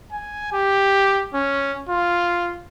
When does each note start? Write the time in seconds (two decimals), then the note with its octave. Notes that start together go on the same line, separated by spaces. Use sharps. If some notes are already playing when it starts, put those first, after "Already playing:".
0.12 G#5
0.53 G4
1.34 C#4
1.89 F4